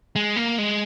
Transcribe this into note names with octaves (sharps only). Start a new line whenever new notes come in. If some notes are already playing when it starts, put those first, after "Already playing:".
G#3
A#3
G#3